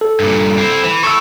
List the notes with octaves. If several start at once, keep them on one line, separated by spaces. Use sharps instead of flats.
A4
G2 A#2
C4 E4
E3
E4 A4 C#6 E6